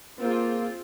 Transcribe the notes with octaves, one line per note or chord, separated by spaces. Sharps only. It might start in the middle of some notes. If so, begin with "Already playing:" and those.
A#3 C4 F4 G#4